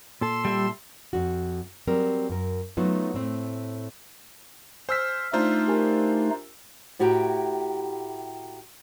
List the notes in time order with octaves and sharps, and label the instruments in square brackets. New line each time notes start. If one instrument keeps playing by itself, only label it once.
[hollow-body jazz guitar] A#2 A4 [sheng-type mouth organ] C6 E6
[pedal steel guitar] G3 E5
[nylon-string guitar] F2 F#4
F#3 G3 C4 A#4
F#2 A#4
F#3 A3 B3 D#4 F4
A2 A3 C4
[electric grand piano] C5 E6 B6 [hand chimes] G#5 F6
[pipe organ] A3 D#4 [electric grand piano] D4 F4 C5 [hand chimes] F6
[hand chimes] G4 A#4 G#5
[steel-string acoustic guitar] A2 E4 F#4 G4 G5 A#5